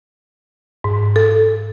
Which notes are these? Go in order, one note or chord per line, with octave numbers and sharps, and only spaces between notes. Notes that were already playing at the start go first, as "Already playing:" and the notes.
G#2
A4